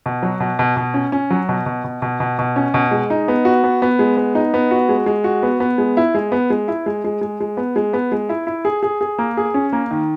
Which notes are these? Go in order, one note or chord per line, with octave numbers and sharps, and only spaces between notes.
B2
F#3
B2
B2
B2
C#4
C#4
F#3
B2
B2
B2
B2
B2
B2
C#4
B2
G#3
D#4
B3
F#4
B3
B3
G#3
B3
D#4
B3
F#4
G#3
G#3
F#4
B3
B3
G#3
E4
G#3
B3
G#3
E4
G#3
G#3
G#3
G#3
B3
G#3
B3
G#3
E4
E4
G#4
G#4
G#4
A#3
G#4
C#4
A#3
D#3